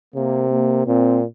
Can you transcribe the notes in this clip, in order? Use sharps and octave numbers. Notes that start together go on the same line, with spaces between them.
C3 A#3
A#3
A#2 C4